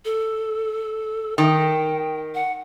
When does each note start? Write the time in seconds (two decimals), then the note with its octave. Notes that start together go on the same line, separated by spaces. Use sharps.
0.05 A4
1.38 D#3 G5
2.35 F#5